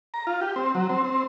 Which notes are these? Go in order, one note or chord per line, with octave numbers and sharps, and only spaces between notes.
A#5
F4
G4
C4
F#3
C4
C4